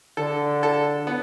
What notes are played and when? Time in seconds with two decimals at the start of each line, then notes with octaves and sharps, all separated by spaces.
0.17 D3 A4
0.63 A4
1.07 B3